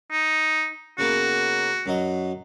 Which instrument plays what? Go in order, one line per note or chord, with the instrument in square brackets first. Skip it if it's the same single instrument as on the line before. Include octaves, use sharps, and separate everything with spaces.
[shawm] D#4
[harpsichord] C#3 A#3 B3 [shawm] F#4
[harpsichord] F#2 F#3 D#5